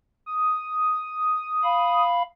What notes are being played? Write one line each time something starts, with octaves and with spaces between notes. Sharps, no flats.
D#6
F5 B5